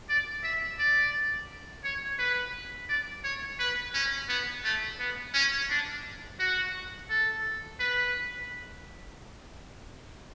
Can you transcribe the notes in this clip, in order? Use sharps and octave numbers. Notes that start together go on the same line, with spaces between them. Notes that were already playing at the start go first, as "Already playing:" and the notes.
D5
E5
D5
C#5
B4
D5
C#5
B4
C#4
B3
A3
B3
C#4
D4
F#4
A4
B4